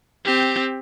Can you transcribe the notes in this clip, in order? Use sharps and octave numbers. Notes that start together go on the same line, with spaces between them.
C4 G4